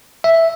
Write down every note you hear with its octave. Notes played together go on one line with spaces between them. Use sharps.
E5